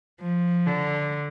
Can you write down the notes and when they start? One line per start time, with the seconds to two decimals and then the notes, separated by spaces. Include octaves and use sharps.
0.20 F3
0.67 D3